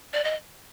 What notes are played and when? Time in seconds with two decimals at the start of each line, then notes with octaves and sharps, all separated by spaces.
0.13 D5
0.24 D#5